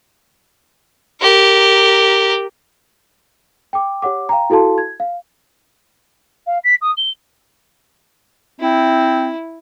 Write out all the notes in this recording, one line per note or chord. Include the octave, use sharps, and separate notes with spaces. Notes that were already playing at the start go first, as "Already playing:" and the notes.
G4 A#4
G5 D6
G4 C#5 F#5 D6
F5 G5 A#5
E4 F#4 A4 F5 A5 C6
G#6
F5
F5
B6
D#6
G7
C4 E4